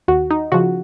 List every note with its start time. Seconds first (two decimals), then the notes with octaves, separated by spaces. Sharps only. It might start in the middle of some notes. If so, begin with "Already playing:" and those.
0.08 D#2 F#4
0.31 D#4
0.52 C#3 F3 F#4